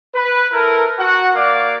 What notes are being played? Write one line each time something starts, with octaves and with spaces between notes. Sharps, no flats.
B4
E4 A4 A#4
F#4 F#5
A#3 D5 F5 D6